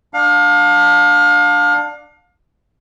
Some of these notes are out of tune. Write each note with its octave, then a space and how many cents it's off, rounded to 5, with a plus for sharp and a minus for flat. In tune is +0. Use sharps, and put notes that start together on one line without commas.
D4 +15 F5 +30